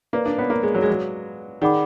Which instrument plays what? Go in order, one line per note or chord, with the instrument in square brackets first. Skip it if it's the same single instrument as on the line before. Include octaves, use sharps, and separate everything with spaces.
[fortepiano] A#3 [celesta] B4 D5 F5
[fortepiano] D4
B3
A#3
G#3
F#3
G#3
F#3
[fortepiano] D#3 [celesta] G#4 D5 F#5 B5 D6